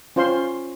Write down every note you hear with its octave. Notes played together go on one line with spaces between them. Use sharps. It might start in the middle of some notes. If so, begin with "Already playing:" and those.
C#4 F4 C5 F5 C6